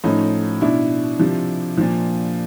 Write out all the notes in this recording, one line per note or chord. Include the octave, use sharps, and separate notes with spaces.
A2 F3 C#4 D#4
B2 D4 E4
C3 F3
A#2 F3